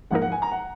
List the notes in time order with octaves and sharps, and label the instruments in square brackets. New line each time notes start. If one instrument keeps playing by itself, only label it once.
[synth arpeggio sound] G#2 F3 A#3 D#4 A#4 [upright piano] F#5
[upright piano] F#5
G#5
A#5
F#5